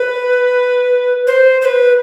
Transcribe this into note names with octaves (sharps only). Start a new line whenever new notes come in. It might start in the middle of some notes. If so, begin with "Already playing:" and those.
Already playing: B4
C5
C5
B4